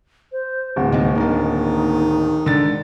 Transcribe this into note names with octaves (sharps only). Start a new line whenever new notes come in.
C5
D1 C2 F#5
C2 G#2 D3 A#3 D#5
D#3 A#3 B3 D4 D#4
G#1 D3 A6